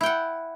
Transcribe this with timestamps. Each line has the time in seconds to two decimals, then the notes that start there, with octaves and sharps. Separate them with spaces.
0.01 E4
0.03 G5
0.06 F#5